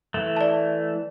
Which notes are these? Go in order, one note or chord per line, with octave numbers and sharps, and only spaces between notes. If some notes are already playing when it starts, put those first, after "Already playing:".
E3 A3
D5 A5